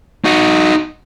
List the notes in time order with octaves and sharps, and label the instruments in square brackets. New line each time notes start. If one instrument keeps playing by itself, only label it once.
[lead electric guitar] D#4 F#4